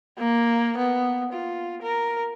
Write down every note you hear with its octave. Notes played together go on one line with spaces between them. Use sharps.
A#3
B3
F4
A#4